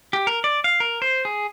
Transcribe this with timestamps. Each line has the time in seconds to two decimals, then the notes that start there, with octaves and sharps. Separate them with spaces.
0.13 G4
0.27 A#4
0.44 D5
0.64 F5
0.80 A#4
1.02 C5
1.25 G#4